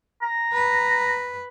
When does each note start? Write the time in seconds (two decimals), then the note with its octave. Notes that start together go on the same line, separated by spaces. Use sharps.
0.22 A#5
0.53 B4